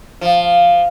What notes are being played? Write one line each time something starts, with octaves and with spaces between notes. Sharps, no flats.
F3